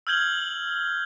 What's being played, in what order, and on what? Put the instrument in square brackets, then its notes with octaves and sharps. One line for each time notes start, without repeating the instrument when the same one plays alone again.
[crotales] E6 F6 G6 G#6 F#7 G7